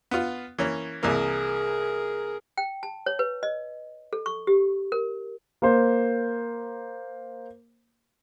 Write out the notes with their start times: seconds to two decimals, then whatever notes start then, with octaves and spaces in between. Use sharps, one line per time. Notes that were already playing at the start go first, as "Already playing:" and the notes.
0.11 B3 F4
0.59 E3 A#3 C#4
1.03 C2 E3 A#3 G#4 A#4
2.58 G5
2.83 A5
3.06 C#5
3.19 B4
3.43 D#5
4.13 A4
4.26 C#6
4.47 G4
4.92 A#4
5.62 A#3 C5